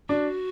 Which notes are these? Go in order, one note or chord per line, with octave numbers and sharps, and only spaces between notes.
D4 F#4